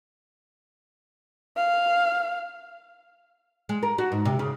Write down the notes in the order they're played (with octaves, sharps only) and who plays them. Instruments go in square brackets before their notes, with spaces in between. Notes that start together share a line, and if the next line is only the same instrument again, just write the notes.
[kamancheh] F5
[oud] G#3
A#4
F#4
G#2
C3
C#3